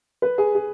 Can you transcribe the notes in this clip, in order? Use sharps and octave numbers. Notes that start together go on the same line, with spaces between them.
B4
G#4
G#4